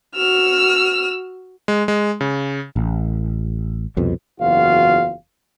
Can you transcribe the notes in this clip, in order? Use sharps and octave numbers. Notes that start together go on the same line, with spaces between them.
F#4 E6 F6
G#3
G#3
C#3
A1
C2 F2 B2
F#1 E2 F4 F#4 F5